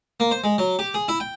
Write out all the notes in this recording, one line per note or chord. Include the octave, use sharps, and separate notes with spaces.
A#3
C5
G#3
F#3
G4
G#4
E4
G5